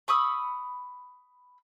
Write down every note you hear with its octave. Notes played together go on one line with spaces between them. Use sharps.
B5 C#6 D#6 E6